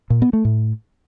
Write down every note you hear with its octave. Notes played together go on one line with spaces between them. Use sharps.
A#2
B3
A3
A2